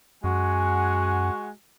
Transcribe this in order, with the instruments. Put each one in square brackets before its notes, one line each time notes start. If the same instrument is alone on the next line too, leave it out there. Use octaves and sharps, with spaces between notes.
[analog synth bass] F#2 [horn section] G#3 F#5 G#5 [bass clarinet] F#4